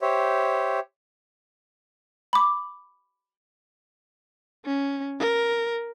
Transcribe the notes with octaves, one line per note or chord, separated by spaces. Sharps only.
G4 C5 C#5 E5
B5 D6
C#4
A#4